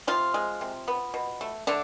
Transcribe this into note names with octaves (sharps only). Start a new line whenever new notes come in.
C3 F3 F4
G#3
C3
B3
B2
A3
D3 A3 D4